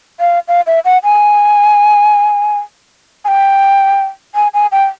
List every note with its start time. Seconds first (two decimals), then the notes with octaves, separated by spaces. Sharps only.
0.20 F5
0.48 F5
0.67 E5
0.85 F#5
1.04 G#5
3.25 G#5
3.28 G5
4.35 G#5
4.54 G#5
4.72 G5